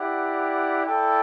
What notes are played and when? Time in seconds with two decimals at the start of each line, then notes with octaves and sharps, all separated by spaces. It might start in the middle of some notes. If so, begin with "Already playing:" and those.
Already playing: E4 G4 D5 F#5
0.84 E4 A4 D5 G5